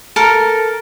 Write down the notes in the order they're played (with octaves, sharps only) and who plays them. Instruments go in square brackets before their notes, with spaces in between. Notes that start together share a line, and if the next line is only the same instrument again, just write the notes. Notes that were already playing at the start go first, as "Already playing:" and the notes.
[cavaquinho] A4 A#4 A#5